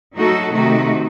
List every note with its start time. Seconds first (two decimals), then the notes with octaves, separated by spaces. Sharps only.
0.15 F#3 A3 D#4 F#4 A4
0.52 C3 D#3 A3 D#4 F#4